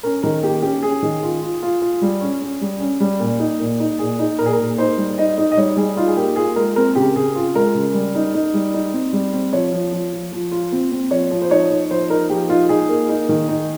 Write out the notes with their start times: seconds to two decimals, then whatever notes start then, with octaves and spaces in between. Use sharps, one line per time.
0.03 C#4 A#4
0.23 D#3 A#4
0.43 A#3 G4
0.62 C#4 G4
0.83 C#4 G#4
1.02 D#3
1.23 F4
1.41 F4
1.62 F4
1.81 F4
2.02 G3
2.21 C#4
2.42 C#4
2.61 G3
2.80 C#4
3.00 G3
3.19 A#2
3.39 D#4
3.60 A#2
3.80 D#4
3.99 A#2 G#4
4.19 D#4
4.39 A#2 A#4
4.46 G#4
4.53 A#4
4.58 A#2
4.78 D#4 C5
4.97 G3
5.18 D#4 D#5
5.38 D#4
5.52 D#5
5.57 G3 C#5
5.77 G3 G#4
5.96 D#4 F4
6.08 G#4
6.17 A#3 G4
6.36 F4 G#4
6.56 G#3 A#4
6.76 C4 A#4
6.95 C#3 G4
7.15 C#3 G#4
7.35 F4
7.55 G#3 A#4
7.75 C#3
7.94 G3
8.15 D#4
8.34 D#4
8.54 G3
8.74 D#4
8.93 C4
9.13 G3
9.33 C4
9.53 F3 C#5
9.72 F3
9.92 F3
10.12 F3
10.32 F3
10.52 F4
10.72 C4
10.91 C4
11.11 F3 C#5
11.31 F3
11.42 C5
11.51 D#4 C#5
11.71 D#4
11.90 F3 C5
12.10 D#4 A#4
12.30 F3 G4
12.49 D#4 F4
12.69 D#4 G#4
12.89 A#3
13.09 D#4
13.29 D#3
13.48 D#4